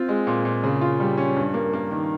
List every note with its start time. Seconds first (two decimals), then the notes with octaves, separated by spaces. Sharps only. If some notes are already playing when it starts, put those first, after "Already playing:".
Already playing: C4 F4
0.09 G#3
0.27 A#2
0.45 A#2
0.63 C#3
0.81 F4
1.00 G3
1.17 C#4
1.36 G2
1.54 A#3
1.73 A#3
1.91 D#3